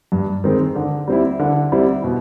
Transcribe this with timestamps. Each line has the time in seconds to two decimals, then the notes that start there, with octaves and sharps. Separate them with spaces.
0.12 G2
0.44 D#3 G#3 C4
0.75 D3
1.08 G3 C4 E4
1.39 D3
1.72 G3 C4 E4
2.04 B2